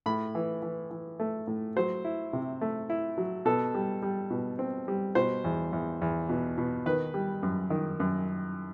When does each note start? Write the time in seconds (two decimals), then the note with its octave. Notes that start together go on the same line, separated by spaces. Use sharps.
0.06 A2 B5
0.35 E3
0.62 E3
0.90 E3
1.20 A3
1.47 A2
1.77 F#3 C5
2.05 E4
2.33 C3
2.61 A3
2.90 E4
3.18 F#3
3.45 B2 A4
3.74 G3
4.03 G3
4.30 B2
4.59 C4
4.88 G3
5.15 B2 C5
5.44 E2
5.73 E2
6.02 E2
6.29 B2
6.58 B2
6.86 D#3 B4
7.14 G3
7.43 F#2
7.70 D#3
8.00 F#2